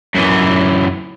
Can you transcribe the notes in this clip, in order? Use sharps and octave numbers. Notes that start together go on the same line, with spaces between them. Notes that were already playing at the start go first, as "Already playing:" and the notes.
F#2 E3